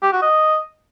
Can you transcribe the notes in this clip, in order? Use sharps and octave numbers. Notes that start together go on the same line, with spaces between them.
G4
F#4
D#5